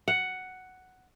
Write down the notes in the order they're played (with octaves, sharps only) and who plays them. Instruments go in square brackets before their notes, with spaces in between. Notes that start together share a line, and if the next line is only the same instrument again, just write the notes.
[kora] F#5